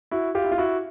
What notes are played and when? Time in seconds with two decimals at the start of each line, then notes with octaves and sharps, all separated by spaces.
0.11 E4 F#4
0.35 F4 G4
0.44 E4
0.52 F4
0.58 E4 F#4